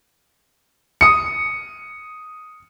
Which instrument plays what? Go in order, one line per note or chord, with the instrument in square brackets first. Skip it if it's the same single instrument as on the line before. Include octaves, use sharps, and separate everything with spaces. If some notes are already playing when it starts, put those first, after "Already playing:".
[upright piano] D#6 C#7